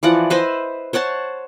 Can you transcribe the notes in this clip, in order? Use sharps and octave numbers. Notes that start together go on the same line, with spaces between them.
E3 F3 D5 F#5
B4 C5 D#5 E5
C5 C#5 F#5 A5